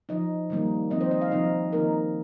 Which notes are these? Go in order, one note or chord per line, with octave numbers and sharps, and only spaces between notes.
F3 D#4 D#5
D#3 G3 A#3 D#4
F3 C4 D#4 D#5
C5
D#5
F5
C3 F3 C4 D#4 D#5
D#3 A#3 D#4 A#4